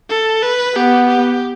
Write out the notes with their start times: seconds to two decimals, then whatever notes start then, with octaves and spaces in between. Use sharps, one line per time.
0.10 A4
0.43 B4
0.76 B3 G4
1.08 G4